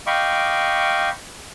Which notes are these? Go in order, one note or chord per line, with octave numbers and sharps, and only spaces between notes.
D#5 F5 G5 B5 C#6 D6